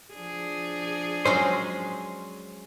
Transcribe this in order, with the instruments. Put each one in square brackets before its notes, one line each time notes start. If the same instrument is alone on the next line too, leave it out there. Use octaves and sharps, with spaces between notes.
[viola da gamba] F3 D4 G#4
[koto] F#3 G#3 C#4 [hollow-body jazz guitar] C5